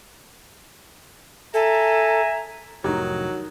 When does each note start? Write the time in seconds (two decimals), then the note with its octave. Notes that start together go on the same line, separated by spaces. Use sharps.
1.54 A4 E5 G#5 A#5
2.84 F1 A2 D#3 F#3 D#4 G4